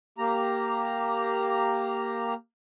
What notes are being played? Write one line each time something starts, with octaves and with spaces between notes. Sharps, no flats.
A#3 G4 A#5